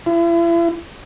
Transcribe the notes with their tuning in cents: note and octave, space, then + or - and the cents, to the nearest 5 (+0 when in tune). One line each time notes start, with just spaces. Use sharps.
E4 +40